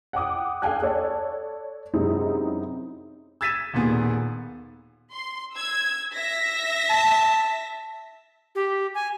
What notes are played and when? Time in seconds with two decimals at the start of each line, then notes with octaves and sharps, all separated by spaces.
0.13 F#5 G5 D6 D#6
0.62 A4 F5 G5 G#5 F#6
0.82 A4 C#5 D5
1.94 F#2 C3 G#3 C4 D#4 E4
3.41 E6 G#6 A6 B6 D#7 E7
3.73 D#1 A#2 D#3 B3 G#4
5.13 C6
5.55 E6 G#6
6.13 E5 A#6 B6
6.90 A5
8.55 G4
8.95 G#5